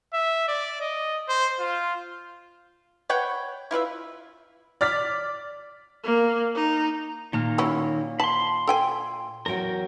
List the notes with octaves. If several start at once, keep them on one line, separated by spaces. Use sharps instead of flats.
E5
D5
D#5
C5
F4
B4 C#5 F#5 G5
E4 F4 B4 E5
D5 F6 A6 B6
A#3
D#4
A#2 D#3 A#5 F6
F#3 C#4 E4
A5 B5 C6
A4 G5 G#5
E2 F#3 F#4 A#4 G5